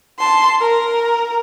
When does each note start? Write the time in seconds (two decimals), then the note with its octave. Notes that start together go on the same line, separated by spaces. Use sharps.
0.19 A5 C6
0.61 A#4